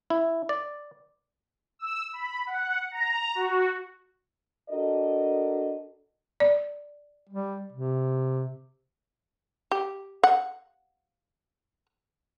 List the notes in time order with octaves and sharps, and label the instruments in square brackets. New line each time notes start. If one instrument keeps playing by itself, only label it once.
[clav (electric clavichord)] E4
D5
[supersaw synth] E6
B5
F#5
A#5
F#4
[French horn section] D4 F#4 A4 A#4 D#5
[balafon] D5
[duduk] G3
C3
[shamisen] G4
F#5